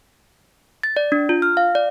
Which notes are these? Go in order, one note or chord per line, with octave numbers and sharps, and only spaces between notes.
A6
D5
D4
F4
F6
F5
D5